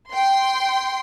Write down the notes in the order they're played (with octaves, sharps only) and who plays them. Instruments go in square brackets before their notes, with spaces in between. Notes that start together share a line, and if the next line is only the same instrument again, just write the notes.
[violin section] G5 C6